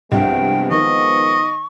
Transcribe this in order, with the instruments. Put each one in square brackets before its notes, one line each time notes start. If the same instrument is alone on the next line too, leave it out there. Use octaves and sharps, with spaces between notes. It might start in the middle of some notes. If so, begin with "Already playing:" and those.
[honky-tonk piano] C2 G2 [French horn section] F3 G#3 B3 [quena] G5
[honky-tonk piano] D#3 [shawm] D#5 [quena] C#6